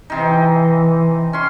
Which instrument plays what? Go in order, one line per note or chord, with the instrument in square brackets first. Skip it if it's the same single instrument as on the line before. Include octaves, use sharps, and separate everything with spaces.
[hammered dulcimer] C3 D#4 [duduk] E3
[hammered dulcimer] C#4 C6